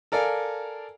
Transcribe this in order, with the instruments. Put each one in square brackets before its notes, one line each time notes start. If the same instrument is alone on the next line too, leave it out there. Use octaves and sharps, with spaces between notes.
[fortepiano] A4 A#4 D5 F5 G#5